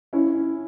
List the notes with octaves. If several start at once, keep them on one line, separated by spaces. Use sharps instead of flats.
C#4 E4